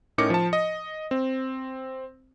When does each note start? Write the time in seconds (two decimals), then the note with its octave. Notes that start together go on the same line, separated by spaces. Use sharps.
0.18 A2 C#4 D#4 A#4 D6 C#7
0.30 F3 A5
0.53 D#5
1.11 C4